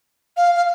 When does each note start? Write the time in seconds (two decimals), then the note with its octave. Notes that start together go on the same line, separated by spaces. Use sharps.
0.37 F5
0.55 F5